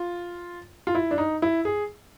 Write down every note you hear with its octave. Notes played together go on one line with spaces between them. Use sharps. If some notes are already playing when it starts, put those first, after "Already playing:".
Already playing: F4
F4
E4
D4
D#4
E4
G#4